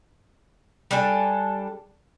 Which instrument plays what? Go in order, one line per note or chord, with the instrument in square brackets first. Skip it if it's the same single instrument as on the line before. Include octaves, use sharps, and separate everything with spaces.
[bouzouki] G3 D4 A4 G#5